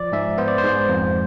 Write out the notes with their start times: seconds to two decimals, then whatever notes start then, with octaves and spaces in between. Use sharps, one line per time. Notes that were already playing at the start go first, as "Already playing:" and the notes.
Already playing: F3 D5
0.12 G#2 E5
0.38 B3 C5
0.48 D5
0.58 C5
0.63 G#2
0.89 F2